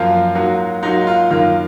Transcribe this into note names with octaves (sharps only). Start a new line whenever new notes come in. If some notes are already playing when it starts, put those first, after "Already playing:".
Already playing: F#2 F3 A#3 F4
G#2 F#3 A#3
G#2 F#3 A#3 D#4
F4
F#2 D#3 A#3 F4